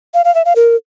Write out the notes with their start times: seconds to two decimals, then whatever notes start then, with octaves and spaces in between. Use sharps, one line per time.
0.14 F5
0.25 F5
0.35 E5
0.45 F5
0.56 A#4